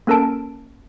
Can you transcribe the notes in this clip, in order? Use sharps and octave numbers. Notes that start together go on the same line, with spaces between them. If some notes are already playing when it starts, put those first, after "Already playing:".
A#3 C#4 A4 A#4 A5 D7